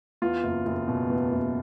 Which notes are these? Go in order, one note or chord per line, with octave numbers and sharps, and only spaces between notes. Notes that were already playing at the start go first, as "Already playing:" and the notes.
E2 F4
F#1
F#1
B2
E2
F#1